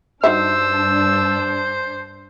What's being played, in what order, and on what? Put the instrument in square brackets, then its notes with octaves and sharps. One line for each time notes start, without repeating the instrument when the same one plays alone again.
[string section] G2 D4 [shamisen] D#4 F#4 E5 [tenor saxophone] C5 [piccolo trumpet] E6